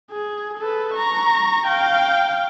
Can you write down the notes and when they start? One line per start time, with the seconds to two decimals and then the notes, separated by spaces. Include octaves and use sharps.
0.12 G#4
0.58 A4 B4
0.95 A#5 C#6
1.67 F5 G5